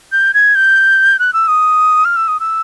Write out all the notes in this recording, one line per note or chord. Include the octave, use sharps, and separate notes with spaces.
G6
G#6
G6
F#6
E6
D#6
F6
E6
D#6
E6